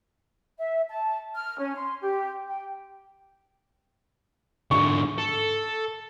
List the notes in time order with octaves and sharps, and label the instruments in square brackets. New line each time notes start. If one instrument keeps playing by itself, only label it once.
[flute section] E5
A5
F6
C#4
C6
G4
G5
[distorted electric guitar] G#2 D3 [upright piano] C#6
[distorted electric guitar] A4